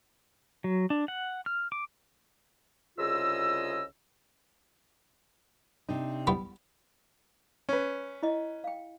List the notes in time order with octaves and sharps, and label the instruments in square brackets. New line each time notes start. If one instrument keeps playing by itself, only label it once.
[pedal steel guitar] F#3
D4
F#5
F6
D6
[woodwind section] C2 C#3 F4 G#4 D#5 E6
[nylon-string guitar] C3 D4 D#4
[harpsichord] G3 B3 E4
[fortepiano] C#4 B4
[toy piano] E4 D#5
F5 G5